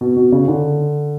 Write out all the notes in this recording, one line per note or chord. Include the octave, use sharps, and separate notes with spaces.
B2
B2
C#3
D3